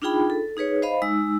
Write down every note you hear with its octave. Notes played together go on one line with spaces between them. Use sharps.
D4 D#4 F4 G#4 G5 B5
A4
D#4 G#4 B4 C#5
C5 D#5 F5 B5
G#3 D#4 E6